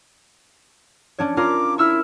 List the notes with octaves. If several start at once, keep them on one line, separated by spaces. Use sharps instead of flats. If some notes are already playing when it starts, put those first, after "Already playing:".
C#4 D4 C#5
C#4 F4 A#4 D6
E4 C#6 E6 F6